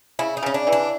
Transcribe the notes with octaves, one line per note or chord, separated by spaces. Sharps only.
C#3 E4
D#4
C#3 C#4
D4
E3
D4